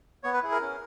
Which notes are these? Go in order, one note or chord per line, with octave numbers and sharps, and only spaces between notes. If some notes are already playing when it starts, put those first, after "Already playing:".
B3 C#5
B4
E4 G#4
A#4
C#4